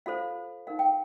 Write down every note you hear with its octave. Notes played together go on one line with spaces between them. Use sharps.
F4 A4 C5 F5
D#4 A#4 F5
G5